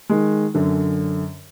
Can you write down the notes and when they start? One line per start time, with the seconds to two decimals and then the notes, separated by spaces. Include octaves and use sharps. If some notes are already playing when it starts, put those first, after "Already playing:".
0.09 D#3 G#3
0.54 F#2 D3 C#4